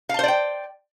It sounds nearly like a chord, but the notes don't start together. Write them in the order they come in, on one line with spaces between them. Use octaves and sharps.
F5 A5 C5 D5 G5